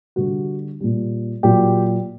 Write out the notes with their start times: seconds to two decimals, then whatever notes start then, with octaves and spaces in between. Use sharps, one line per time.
0.16 D3 G3 F#4
0.80 A#2 G3
1.43 A#2 F#3 G4